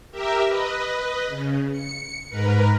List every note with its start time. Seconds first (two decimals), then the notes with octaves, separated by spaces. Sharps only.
0.11 G4 A#4 E5
0.46 B4 D#5
1.28 C#3
1.71 C#7
2.29 G#2 A#4 B4